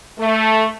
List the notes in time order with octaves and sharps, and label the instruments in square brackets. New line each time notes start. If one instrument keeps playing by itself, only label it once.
[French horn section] A3